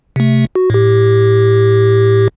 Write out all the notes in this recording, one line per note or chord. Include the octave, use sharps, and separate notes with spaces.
C3 A3
F#4
A2 G4